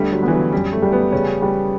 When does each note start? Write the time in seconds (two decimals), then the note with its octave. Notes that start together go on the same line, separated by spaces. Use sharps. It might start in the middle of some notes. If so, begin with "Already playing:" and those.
Already playing: G1 D3 G3 A3
0.13 F#3
0.23 E3 B3
0.33 F#3
0.52 F#2 G3
0.73 A3
0.83 G3
0.92 B3
1.12 C#3 C#4
1.42 G3